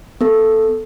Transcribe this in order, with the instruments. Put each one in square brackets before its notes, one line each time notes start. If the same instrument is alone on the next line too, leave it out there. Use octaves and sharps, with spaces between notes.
[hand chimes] B3 A4